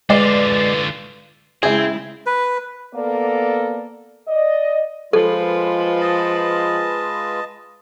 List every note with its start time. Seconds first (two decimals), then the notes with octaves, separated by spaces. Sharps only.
0.10 D3 G#3 F4 B4 D5
1.63 C#3 G#3 C4 E4 G#4 E5 G#6
2.26 B4
2.94 A#3 B3 A4 A#4 D5
4.28 D5 D#5
5.13 F3 G#3 F4 A4 B4
6.01 D#5 A5